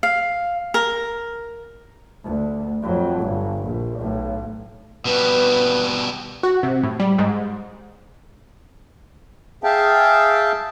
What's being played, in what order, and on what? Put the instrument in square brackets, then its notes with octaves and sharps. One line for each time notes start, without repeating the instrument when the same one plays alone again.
[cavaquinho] F5
A#4
[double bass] D2
F2 F#3
G1
A#1
B1 A2
[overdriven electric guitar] B2 G3 [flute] B4
[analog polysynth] F#4
C3
A2
G3
G#2
[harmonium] G#4 E5 F5 G5 A5